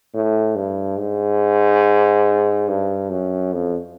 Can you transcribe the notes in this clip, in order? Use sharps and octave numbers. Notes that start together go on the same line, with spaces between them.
A2
G2
G#2
G2
F#2
F2